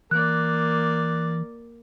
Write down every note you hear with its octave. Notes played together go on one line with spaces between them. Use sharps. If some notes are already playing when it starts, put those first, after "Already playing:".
E3 A#3 D5 F#6